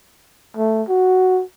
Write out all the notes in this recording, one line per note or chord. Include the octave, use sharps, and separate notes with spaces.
A3
F#4